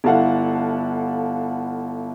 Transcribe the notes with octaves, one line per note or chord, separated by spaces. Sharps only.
G1 E4 A4 F5 F#5